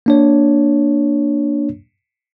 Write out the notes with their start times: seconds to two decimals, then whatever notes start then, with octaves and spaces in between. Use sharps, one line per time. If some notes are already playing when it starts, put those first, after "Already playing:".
0.06 A#3 D4 C#5